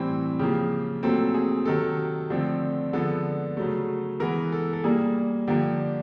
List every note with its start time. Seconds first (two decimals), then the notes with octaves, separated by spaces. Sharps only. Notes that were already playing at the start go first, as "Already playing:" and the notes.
Already playing: A2 E3 G3 C4
0.39 C#3 F3 A#3 G4
1.03 A#2 F#3 A3 C4 A4
1.34 G#4
1.65 C3 D#3 F#3 A4
2.30 D3 F3 A3 C4
2.93 D3 F3 G#3 B3 A4
3.57 C#3 F#3 A3
4.20 E3 G#3 B3 A#4
4.52 A4
4.73 A4
4.84 A#2 G3 A#3 G#4
5.47 D3 F3 A#3 G4